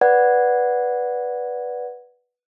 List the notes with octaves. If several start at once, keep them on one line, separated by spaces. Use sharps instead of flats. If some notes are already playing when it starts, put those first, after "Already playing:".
B4 D5 F#5 G#6